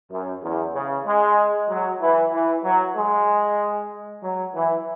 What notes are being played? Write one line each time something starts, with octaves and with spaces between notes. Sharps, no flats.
F#2
E2
C#3
G#3
F#3
E3
E3
F#3
G#3
F#3
E3